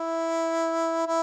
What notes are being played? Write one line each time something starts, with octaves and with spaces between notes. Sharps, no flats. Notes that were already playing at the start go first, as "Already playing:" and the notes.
Already playing: E4
E4